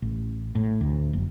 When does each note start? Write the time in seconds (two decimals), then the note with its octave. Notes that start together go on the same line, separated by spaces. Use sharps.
0.02 A1
0.55 A2
0.81 D2
1.13 F#1